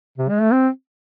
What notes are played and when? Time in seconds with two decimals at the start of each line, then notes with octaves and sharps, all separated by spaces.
0.18 C3
0.30 G#3
0.41 A3
0.53 C4